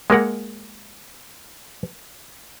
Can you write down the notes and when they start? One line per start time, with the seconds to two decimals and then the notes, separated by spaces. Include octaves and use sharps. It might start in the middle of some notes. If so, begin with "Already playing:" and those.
0.10 G#3 A#3 A#4 F#5